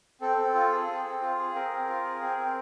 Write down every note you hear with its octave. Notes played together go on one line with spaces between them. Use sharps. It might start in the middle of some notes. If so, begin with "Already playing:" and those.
C4 A4
C4
F4
G#4
C4
C4
F4
G#4
C4 A#4
C4
F4
G#4
C4
C4